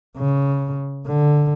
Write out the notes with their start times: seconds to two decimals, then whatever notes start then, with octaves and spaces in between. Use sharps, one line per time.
0.17 C#3
1.06 D3